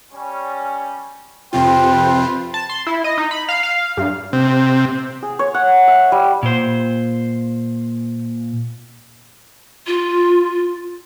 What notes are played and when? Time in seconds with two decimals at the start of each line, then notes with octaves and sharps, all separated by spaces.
0.12 G3 C#4
1.53 F2 C3 F4 B4 C5 G5
2.54 A5
2.69 C6
2.87 E4
3.04 D#5
3.18 D#4
3.31 B5
3.49 F5
3.63 F5
3.97 G2
4.33 C3
5.22 G#4
5.39 C#5
5.54 F#5
5.88 E5
6.12 G3
6.43 A#2 C5
9.87 F4